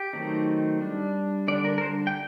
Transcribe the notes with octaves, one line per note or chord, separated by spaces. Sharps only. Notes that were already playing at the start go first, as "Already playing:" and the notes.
Already playing: G4
D#3 F#3 A3 C4 D#4
G3 D4
D3 G3 D4 D5
A#4
A#4
C5
G5